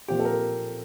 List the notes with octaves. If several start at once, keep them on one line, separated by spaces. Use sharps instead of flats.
A#2 F3 C4 G4
A4
A#4